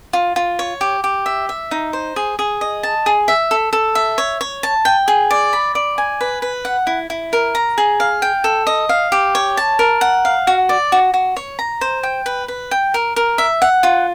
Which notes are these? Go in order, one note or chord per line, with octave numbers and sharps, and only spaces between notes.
F4
F4
C#5
G4
G4
E5
E5
D#4
C5
G#4
G#4
D#5
A5
G#4
E5
A4
A4
E5
C#5
C#5
A5
G5
G#4
D5
B5
D5
G#5
B4
B4
F#5
E4
E4
A#4
A#5
G#4
F5
G5
A4
D#5
F5
G4
C#5
A5
A#4
F#5
F5
F#4
D5
F#4
F#4
C#5
A#5
C5
G5
B4
B4
G5
A#4
A#4
E5
F#5
F4